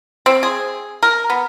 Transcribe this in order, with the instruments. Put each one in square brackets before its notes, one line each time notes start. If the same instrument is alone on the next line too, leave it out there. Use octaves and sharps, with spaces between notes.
[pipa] C4
G#4
A#4
B3